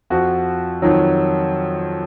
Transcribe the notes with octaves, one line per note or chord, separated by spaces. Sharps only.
F2 F3 F#4
F2 D#3 F#3